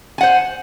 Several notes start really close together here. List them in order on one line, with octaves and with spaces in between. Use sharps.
G#5 F#5 C5